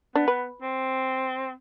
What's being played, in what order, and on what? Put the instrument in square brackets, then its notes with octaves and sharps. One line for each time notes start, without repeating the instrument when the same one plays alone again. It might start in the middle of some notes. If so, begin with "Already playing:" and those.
[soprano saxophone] B3 [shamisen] D4
[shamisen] B4
[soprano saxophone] C4